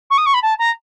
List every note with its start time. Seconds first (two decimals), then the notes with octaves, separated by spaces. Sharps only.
0.10 C#6
0.18 D#6
0.26 C#6
0.34 B5
0.43 A5
0.59 A#5